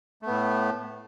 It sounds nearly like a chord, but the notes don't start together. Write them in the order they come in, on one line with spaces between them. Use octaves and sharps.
A3 B3 A2